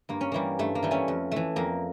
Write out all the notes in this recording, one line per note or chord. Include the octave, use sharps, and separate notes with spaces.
G2 A#3
C#4
E3 G3 A#3
G2 A3
A#3
E3 G3
A3 C#4
F2
E3 A3
F2 A#3